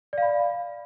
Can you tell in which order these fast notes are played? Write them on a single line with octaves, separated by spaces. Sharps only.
D5 F5 B5